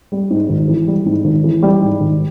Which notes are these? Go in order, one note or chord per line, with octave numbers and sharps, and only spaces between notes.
G3
G#2
G#1
E3
G3
G#2
G#1
E3
G3
G#2
G#1